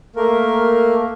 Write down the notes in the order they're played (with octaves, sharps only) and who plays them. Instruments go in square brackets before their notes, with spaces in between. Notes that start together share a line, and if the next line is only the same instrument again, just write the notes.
[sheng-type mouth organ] A3 A#3 A#4